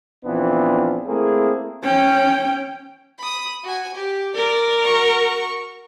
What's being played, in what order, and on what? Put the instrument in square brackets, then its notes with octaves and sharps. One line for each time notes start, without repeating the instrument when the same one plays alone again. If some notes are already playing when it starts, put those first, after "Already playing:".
[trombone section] A#1 E3 B3 C4 D4 F4
A3 A#3 C4 E4 G#4
[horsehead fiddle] C#4 G5
[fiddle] B5 D#6
F#4 G#5
G4
[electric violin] A#4 [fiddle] D5
[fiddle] F#4 C#6